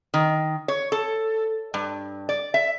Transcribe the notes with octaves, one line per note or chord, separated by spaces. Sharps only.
D#3
C#5
A4
G2
D5
E5